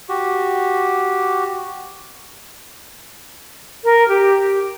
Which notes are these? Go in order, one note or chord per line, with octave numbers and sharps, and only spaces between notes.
F#4 G4
A#4
G4